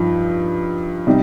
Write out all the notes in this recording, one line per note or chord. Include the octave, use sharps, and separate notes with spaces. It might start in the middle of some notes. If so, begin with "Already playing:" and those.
Already playing: G2 F3 D#4
C3 G3 D#4